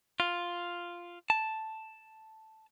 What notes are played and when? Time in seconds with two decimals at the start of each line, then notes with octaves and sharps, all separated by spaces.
0.20 F4
1.30 A5